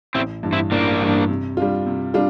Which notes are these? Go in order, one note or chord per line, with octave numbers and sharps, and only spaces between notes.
A1 C4 E4
G2 E3
C4 E4
A1 A#3 D4
G2 E3
C3
G3 D4 F4
C3
G3 D4 F4